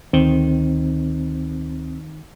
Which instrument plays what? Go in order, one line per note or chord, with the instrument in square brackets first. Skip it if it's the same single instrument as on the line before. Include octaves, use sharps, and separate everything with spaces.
[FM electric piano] D2 [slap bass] D#3 [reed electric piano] C4